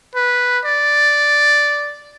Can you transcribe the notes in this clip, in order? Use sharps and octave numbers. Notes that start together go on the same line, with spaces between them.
B4
D5